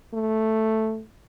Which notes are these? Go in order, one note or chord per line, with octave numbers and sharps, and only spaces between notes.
A3